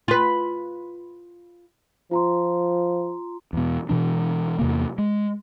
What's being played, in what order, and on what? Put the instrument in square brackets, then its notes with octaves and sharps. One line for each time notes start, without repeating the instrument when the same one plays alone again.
[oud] F4 B4
[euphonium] F3 [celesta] F4 A#5 C6
[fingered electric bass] E2 B2
B2 E3 D4
E2 C3 A#3
G#3